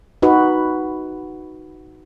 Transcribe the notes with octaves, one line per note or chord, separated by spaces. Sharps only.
D#4 F#4 B4